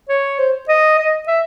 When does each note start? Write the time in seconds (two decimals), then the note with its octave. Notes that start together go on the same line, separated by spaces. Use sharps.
0.09 C#5
0.39 C5
0.68 D#5
0.99 D#5
1.28 E5